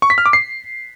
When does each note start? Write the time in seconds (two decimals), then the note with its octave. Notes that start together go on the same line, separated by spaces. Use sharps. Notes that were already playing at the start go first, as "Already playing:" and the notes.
0.02 C#6
0.10 B6
0.18 F6
0.26 D6
0.33 C7